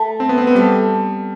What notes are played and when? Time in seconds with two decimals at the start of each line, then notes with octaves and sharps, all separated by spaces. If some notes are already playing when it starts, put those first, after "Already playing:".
Already playing: A3
0.20 C4
0.29 B3
0.38 C4
0.47 B3
0.55 G3 A3